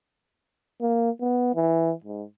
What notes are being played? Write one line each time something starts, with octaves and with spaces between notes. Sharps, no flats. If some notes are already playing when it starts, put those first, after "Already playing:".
A#3
B3
E3
G#2